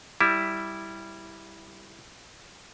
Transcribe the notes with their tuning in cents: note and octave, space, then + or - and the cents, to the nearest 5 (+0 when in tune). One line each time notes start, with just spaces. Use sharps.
G3 +0 E4 +0